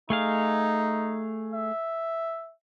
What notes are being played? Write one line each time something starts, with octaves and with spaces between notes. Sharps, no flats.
A3 D#4 G#4 F5
E5